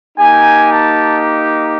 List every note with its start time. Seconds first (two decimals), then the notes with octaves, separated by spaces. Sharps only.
0.18 A#3 D#4 G4 G#5
0.71 A5